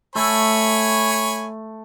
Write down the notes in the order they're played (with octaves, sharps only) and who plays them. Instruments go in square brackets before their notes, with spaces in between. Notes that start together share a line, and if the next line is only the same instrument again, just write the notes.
[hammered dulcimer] A3 [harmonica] C#5 G#5 B5